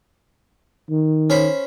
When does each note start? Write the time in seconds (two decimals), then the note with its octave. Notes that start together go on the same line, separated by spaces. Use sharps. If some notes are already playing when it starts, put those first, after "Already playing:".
0.90 D#3
1.30 C#4 C5 B5